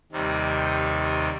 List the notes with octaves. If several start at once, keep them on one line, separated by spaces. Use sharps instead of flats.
D#2 C3 D#3 G3